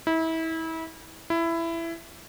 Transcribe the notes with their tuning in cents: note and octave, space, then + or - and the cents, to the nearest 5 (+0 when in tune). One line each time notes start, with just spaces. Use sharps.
E4 -30
E4 +15